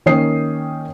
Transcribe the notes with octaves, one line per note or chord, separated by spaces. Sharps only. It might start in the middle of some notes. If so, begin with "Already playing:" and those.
D#3 A#3 C#4 G5 D#6 C7